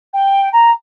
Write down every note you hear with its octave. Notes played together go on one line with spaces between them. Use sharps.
G5
A#5